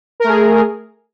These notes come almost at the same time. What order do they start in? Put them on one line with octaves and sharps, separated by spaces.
A#4 A3 G#4